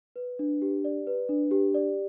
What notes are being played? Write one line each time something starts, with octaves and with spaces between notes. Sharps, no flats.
B4
D4
G4
D5
B4
D4
G4
D5